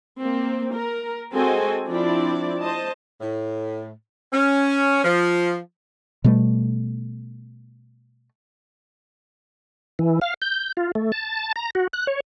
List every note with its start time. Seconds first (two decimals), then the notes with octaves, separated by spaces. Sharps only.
0.19 A#3 C4
0.74 A#4
1.34 G#3 C4 F#4 A4 D#5 G#5
1.87 F3 C4 D4 E4 D5
2.61 C5 D#5 A5
3.21 A2
4.33 C#4
5.05 F3
6.24 B2 G3 A3
9.99 E3
10.21 F5
10.42 G6
10.77 F4
10.95 A3
11.12 A5
11.56 A#5
11.75 F#4
11.93 F#6
12.07 C#5